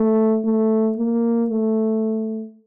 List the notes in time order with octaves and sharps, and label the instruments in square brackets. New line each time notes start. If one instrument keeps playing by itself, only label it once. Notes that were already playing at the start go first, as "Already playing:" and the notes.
Already playing: [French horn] A3
A3
A#3
A3